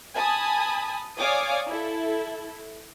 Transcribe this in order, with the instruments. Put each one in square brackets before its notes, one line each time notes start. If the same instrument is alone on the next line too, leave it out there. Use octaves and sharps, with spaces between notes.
[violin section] G#5 A5 B5 D#6
C#5 D5 F5 G#5 D6 D#6
E4 A4